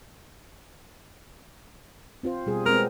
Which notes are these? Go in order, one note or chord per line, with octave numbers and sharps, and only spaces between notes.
C4 F4 C5
B2 G3 G#4
G#3 B3 C4 A#4